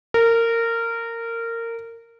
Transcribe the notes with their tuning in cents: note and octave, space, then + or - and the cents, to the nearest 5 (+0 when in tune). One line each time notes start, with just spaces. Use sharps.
A#4 -20